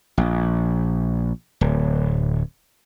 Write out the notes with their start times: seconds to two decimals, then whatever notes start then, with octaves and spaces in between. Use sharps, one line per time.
0.18 A#1
1.61 D1